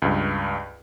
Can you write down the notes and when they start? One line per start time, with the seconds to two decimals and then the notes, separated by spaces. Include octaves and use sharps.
0.02 C#2 G2